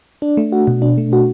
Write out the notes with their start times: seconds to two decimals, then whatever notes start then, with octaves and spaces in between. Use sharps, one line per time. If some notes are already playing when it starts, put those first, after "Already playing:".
0.22 D4
0.37 A3
0.52 F#4
0.67 B2
0.82 D4
0.98 A3
1.13 F#4